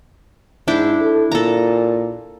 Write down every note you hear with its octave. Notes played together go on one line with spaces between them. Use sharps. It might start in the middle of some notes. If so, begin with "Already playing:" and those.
G#2 D4 E4 G5
A4
A#2 A4 A#5